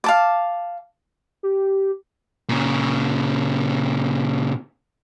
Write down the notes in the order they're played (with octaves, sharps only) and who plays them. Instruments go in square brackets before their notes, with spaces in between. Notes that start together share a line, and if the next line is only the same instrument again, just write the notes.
[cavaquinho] F5 A5 D6
[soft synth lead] G4
[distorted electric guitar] A#2 C#3